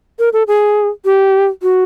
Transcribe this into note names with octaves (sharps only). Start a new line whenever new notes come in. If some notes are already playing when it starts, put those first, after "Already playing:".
A#4
A4
G#4
G4
F#4